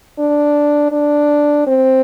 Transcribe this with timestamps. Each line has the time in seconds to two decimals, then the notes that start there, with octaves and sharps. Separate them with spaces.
0.19 D4
0.92 D4
1.67 C4